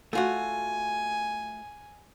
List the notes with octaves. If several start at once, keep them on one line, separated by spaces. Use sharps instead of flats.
A3 F4 F#4 G#5